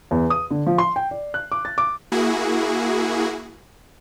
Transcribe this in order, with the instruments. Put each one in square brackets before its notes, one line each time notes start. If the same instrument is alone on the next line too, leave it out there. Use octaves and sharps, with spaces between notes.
[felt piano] E2
D#6
D3
F3
C6
G5
D5
F#6
D6
A6
D6
[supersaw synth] A#3 E4 F#4 G#4